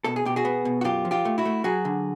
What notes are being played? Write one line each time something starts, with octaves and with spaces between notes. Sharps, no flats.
B2 A4
G#4
B2 G4
F#4 G#4
B3
B2
F#4
F#2 F4 G4
F3
F4 G4
A3
E4 F#4
A3
F#3 F#4 G#4
D3